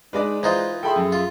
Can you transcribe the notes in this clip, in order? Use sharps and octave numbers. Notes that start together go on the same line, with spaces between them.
G#3 D4 D#4 B4 D5
E3 D#4 F4 B4 C5
G#4 A4 E5 G5 B5 C6
F#2
F4